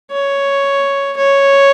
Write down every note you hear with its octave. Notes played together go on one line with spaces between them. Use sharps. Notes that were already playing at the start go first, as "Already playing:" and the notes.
C#5
C#5